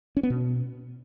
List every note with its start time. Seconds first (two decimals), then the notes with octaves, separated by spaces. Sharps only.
0.17 C#4
0.23 B3
0.30 B2